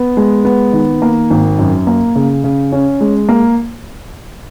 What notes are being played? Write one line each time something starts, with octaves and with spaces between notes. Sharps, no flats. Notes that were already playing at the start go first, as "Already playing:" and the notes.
Already playing: B3
G#3
B3
D#3
A#3
G#1
F#2
A#3
C#3
C#3
C#4
G#3
A#3